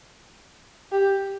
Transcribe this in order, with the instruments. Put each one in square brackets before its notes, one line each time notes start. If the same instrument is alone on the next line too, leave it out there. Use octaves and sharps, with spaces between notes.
[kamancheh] G4